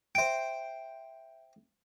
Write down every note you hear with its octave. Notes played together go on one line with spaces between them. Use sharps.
C5 E5 G5 D7